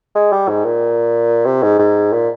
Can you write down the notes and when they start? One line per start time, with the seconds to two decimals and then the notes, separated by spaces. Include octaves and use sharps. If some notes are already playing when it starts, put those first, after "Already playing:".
0.15 G#3
0.32 G3
0.48 G#2
0.65 A#2
1.46 C3
1.63 G#2
1.79 G#2
2.12 A#2